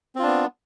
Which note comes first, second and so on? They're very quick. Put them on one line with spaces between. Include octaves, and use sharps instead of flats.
C4 F4 D4 B3